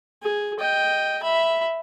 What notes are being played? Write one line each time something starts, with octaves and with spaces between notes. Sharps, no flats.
G#4
D#5 G5
E5 B5